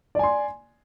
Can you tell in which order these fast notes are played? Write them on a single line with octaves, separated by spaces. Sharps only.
D5 G#5 C6